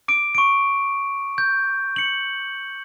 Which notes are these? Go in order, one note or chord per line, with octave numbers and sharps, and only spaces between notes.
D6 D7
C#6 D7
G6
C#7 F#7